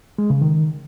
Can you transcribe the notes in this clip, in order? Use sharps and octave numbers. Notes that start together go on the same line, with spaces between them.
G#3
C#3
D#3